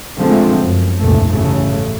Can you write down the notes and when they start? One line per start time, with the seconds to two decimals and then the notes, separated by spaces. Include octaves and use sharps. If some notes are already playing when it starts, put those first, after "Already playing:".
0.17 D3 F3 G#3 A3 C4
0.62 F#2
0.98 F1 C#2 G2 A#2 A3
1.29 A1 C#3 A3